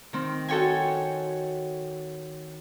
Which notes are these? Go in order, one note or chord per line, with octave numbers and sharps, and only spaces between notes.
D#3 C4
F#4 A4 C#5 G5 G#5